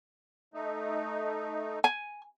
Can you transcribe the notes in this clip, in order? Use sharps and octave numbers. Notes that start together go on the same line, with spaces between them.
A3 D#4
G#5